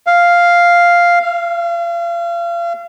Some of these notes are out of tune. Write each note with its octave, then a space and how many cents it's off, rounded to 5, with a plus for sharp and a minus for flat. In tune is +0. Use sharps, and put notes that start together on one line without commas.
F5 +0
F5 -35